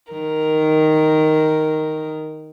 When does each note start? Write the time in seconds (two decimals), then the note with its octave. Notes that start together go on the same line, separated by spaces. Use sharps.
0.12 D#3 A#4